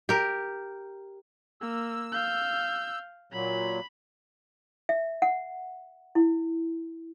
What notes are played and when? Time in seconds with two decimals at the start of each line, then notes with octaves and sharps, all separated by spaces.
0.09 G4 A#4
1.61 A#3 E6
2.12 F5 G6
3.32 A#2 F#3 B5
4.89 E5
5.22 F#5
6.15 E4